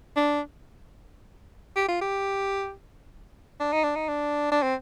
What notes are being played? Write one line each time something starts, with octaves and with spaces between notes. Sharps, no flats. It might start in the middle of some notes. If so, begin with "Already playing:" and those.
D4
G4
F4
G4
D4
D#4
D4
D#4
D4
D4
C4